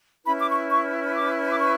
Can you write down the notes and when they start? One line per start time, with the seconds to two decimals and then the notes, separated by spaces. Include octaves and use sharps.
0.25 C#4 E4 B4 B5
0.39 D6
0.48 C#6
0.70 C#6
1.15 D6
1.51 D6
1.60 C#6